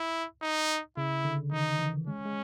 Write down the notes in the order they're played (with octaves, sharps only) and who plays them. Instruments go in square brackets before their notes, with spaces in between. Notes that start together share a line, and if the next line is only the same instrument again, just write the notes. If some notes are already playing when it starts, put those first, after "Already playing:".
Already playing: [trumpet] E4
D#4
[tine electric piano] C#3 [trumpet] E4
[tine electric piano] D3
[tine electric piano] D#3 [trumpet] D#4
[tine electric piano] E3
[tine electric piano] G#3 [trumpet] C#4
[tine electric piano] G#3